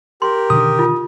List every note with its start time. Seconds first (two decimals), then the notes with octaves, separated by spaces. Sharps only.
0.22 G4 A#4 C6
0.50 B2 D3 D#3 D#6
0.79 F4